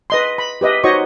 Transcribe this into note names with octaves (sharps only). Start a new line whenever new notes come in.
B4 D#5 C6
B5
G4 B4 D#5 E5
D#4 F#4 C5 C#5 D#5 C#6